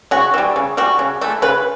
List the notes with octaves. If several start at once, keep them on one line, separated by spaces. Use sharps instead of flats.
C#3 F#4
E3 G3
C#3
E3 G3 F#4
C#3
E3 A3
C#3 B4